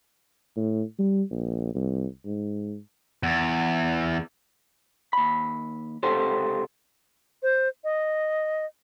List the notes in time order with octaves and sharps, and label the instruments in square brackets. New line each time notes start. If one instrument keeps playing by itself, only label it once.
[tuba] A2
G3
A#1
C2
G#2
[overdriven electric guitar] E2
[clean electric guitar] D#2 B5
C#2 C3 G4 A4 C5
[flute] C5
D#5